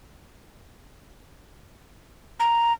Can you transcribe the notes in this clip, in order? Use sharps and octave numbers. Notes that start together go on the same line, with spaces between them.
A#5